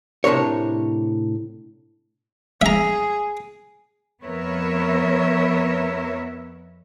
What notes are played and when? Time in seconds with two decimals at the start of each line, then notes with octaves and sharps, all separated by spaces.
0.24 A2 C3 D4 A#4 C#5
2.62 G#4 E5 A#5
4.22 F2 B3 A#4 B4 C#5 E5